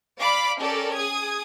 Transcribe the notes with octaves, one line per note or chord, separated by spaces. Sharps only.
D5 F5 B5 D6
C#4 G4 A4 A#4 D5
G#4 D#6 G#6